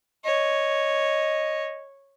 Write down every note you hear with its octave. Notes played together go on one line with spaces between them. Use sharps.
C#5 D#5